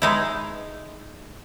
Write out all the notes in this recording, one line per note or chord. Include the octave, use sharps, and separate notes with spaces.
G#3 D#4 E4